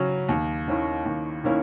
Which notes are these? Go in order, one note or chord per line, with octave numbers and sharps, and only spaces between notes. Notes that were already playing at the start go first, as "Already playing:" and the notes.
Already playing: C#3 F#3 C#4
D#2
D#3 A#3 C#4 E4
D#2
D#3 A#3 C#4 E4